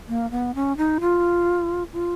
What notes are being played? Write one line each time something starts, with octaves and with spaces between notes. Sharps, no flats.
A#3
B3
C#4
D#4
F4
F4